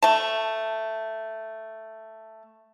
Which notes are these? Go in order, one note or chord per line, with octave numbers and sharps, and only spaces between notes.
A3 A5